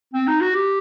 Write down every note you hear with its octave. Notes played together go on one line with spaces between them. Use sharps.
C4
D#4
F#4
G4